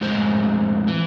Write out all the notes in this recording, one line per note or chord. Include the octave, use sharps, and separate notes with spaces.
F2 A2 G#3 C5
E3